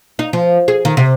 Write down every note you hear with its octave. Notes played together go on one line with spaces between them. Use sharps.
D#4
F3
G#4
D#3
C3